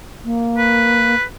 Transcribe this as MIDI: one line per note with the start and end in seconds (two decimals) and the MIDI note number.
0.25 1.15 58
0.57 1.23 71